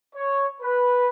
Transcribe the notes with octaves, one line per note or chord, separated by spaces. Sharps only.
C#5
B4